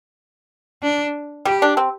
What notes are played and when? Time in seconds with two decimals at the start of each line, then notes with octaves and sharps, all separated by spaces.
0.83 D4
1.45 G3 G4
1.62 D4
1.77 C4